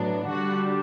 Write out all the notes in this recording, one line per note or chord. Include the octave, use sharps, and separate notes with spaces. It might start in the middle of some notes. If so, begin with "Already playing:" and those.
Already playing: A2 F#3 B3 D4
D3 G3 D4 F#4